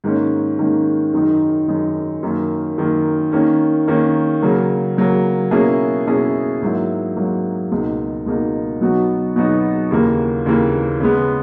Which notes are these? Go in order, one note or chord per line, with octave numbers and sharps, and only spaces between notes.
G#2 D#3 A#3 C#4
G#2 D#3 A#3 C#4
F#2 D#3 G#3 D#4
F#2 D#3 G#3 D#4
F#2 D#3 A#3
F#2 D#3 A#3
D#3 A#3 C#4
D#3 A#3 C#4
C#3 F#3 A#3
C#3 F#3 A#3
B2 A#3 C#4 E4 G#4
B2 A#3 C#4 E4 G#4
G#2 F#3 A#3 E4
G#2 F#3 A#3 E4
C#2 B2 A#3 D#4
C#2 B2 A#3 D#4
B2 F#3 B3 D#4 F#4
B2 F#3 B3 D#4 F#4
D#2 C#3 E3 A#3
D#2 C#3 E3 A#3
C#3 G#3 B3